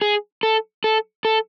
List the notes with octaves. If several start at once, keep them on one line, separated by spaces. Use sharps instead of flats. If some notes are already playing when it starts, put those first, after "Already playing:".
G#4
A4
A4
A4